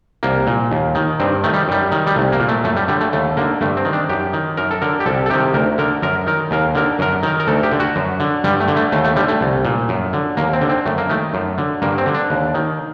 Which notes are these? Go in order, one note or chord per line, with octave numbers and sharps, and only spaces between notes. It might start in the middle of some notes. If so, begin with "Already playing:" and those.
C2 A#3
A#2
D#2
D#3
G2 C4
D#3 A3
G3
F#2 G3
D#3
G3
C2 A3
A#3
A#2
A3
F#2 A3
G3
D3 G3
A3
D#2 A3
D3 A#3
G2 A3
C4
D#3
D4
F#2 G4
D#3
F#2 A#4
A4
D3 A#4
G4
C2 A4
A4
C3 D#3 G4
D2 A#4
D3 A#4
F#2 A#4
D#3 A#4
D#2 A#4
D3 A#4
F#2 A#4
D#3 A#4
A#4
D2 A4
G4
D3
F#4
F#2
D3
G2 G3
A3
D3
A3
D#2 A3
A3
D3 G3
A3
C2
A#2
F#2
D3
D#2 A#3
C4
D3
C4
F#2 A3
A#3
D#3 A3
F#2
D3
G2 A#3
C4
D3
D4
D#2
D#3